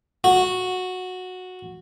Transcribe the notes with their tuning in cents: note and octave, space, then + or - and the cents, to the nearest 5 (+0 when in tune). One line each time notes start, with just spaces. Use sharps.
F#4 -10